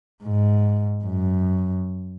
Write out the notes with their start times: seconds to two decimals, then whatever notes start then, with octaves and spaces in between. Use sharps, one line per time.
0.24 G#2
1.04 F#2